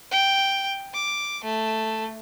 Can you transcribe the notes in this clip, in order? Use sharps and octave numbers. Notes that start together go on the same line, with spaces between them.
G5
D6
A3